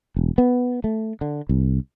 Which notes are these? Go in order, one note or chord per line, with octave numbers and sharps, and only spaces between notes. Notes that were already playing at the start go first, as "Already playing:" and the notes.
E1
B3
A3
D3
C2